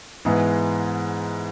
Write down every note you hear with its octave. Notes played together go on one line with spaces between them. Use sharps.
G#2 E3 G#3 B3